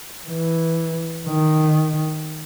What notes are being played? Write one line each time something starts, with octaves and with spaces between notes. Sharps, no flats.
E3
D#3